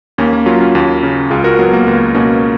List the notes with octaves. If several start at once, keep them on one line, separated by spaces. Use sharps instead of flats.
D#2 A#3 C#4
A#3
F#3 C#4 F4
C#4 F4
D#2
C#3
C#2 F4 G#4
F#4 A#4
F#3 B3
A#3
C#2 A#3
B2 A#3 C#4